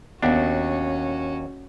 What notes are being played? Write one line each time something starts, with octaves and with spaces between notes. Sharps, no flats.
D#2 B3 C#4 D4 F#4